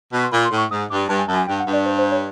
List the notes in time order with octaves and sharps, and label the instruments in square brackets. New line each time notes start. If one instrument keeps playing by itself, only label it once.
[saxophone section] B2
[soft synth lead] C6
[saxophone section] A#2 [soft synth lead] B5
[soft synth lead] C6
[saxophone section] A2
[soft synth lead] C#6
[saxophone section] G#2 [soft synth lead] D#6
[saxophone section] G2 [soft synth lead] D6
[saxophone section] G2 [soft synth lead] A5
[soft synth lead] G#5
[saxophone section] F#2 [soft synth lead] A5
[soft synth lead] G#5
[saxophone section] G2 [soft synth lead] G5
[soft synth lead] F#5
[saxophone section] G2
[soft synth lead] D5
C5
C5
C#5